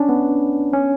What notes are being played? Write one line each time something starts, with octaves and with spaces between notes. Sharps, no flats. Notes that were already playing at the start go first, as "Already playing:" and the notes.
Already playing: C#4 D4
B3
C#4